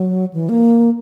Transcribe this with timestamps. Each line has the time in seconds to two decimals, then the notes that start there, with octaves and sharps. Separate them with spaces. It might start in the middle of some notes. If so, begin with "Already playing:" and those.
Already playing: F#3
0.33 E3
0.49 A#3